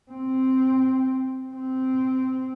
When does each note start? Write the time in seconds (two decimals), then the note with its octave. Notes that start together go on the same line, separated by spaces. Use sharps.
0.11 C4
1.54 C4